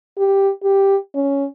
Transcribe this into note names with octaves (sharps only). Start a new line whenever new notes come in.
G4
G4
C#4